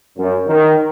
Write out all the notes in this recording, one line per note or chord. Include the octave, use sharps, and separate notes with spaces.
F#2
D#3